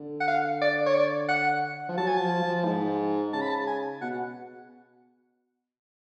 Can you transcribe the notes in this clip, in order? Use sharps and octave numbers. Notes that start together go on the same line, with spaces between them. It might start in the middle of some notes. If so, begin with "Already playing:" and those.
Already playing: D3
F#5
F5
D5
C#5
D5
F#5
F3
F#3 A5
G#5
F3 A5
F3
G#2
C#3 A5
B5
A5
G#5
B2 F#5